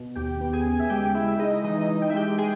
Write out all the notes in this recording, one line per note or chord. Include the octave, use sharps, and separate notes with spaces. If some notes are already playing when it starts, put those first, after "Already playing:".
Already playing: B2
D#2 G4 G5
B3
G#4 G#5
C#3
E5
G#3 G4 G5
G#3 E4 E5
E5
G#3 D#4 D#5
E3 D#4 D#5
D#4
G5
E5
G#3 G4 G5
G#3 G#4 G#5